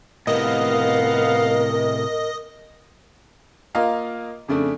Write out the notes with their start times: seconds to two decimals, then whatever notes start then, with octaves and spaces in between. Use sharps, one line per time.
0.27 A2 C3 B3 A#4 D#5 F5
3.75 A#3 F4 A#4 D#5 F5
4.48 F2 C#3 A3 D4